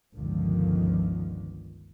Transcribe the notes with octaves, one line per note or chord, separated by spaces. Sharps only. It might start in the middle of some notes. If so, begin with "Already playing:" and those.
G1 C#2 D3 D#3 F3